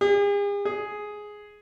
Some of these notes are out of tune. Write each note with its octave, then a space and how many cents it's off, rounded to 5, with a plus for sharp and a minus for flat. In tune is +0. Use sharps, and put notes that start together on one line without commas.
G#4 -45
G#4 +5